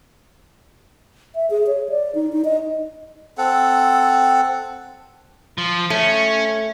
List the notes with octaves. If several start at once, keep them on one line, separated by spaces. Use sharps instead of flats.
E5
G#4
C#5
D5
D#4
D#4
D#5
C4 A4 F#5
F3
A3 C#4